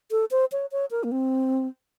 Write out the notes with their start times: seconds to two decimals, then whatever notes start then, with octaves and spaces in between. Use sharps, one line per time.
0.11 A4
0.31 C5
0.52 C#5
0.72 C#5
0.91 A#4
1.04 A#3
1.12 C4